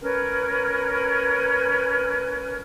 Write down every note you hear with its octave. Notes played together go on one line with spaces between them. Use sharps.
C#4 A#4 B4